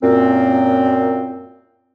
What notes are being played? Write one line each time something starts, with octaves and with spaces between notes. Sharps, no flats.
F#2 A#2 C4